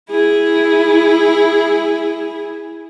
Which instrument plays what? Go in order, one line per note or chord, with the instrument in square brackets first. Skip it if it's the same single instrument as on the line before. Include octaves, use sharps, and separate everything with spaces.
[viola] E4 G#4